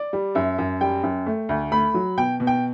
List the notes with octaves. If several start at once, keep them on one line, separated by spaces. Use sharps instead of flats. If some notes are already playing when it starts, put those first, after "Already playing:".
Already playing: D5
G3
F#2 E5
F#2
G3 G5
F#2
A3
D2
A3 B5
F#3
B2 G5
B2
G5